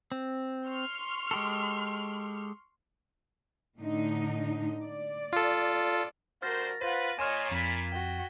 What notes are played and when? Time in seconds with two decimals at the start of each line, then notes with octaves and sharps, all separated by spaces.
0.12 C4
0.68 C6 C#6 F6
1.31 G#3 G4 A4
3.77 A2 D3 D#4
4.83 D5
5.33 F4 A4
6.42 D2 G2 F#4 A#4 C5 F6 A6 A#6
6.81 F4 B4 C5 F#5
7.19 A#2 C#5 D#5 G#5 C6 F6 D#7 E7
7.51 F2 B5 G#6 B6
7.91 F#4 G5